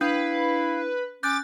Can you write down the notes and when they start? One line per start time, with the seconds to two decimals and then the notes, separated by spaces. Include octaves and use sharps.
0.01 D4 E4 B4 F5
1.23 C#4 D6 F#6 G6 A6